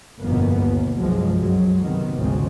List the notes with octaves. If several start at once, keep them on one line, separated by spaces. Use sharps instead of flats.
G1 F2 B2 A#3 B3
D#2
C2 G2 B2 F3 F#3 G#3
F#2 F#3 G#3
C3 D#3 B3
G#1 D2 C#3 F3 G#3 C4